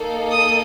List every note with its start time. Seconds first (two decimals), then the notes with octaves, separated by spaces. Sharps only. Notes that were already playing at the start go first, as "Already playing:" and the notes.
Already playing: A#3 D#4 A4
0.31 D#6